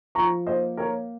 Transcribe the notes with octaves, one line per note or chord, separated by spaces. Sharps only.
F3 A#5 C#6
A#3 C5 D#5
A#3 A#4 C#5